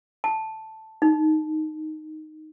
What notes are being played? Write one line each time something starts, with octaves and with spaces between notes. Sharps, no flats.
A5
D#4